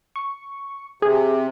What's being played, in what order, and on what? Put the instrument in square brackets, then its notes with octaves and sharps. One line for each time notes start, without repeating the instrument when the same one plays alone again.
[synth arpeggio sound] C#6
[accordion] C3 [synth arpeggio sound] G#4